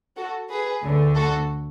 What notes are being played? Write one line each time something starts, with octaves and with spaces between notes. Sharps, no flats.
F#4 A4
G#4 B4
D2 D3 A3
F#4 A4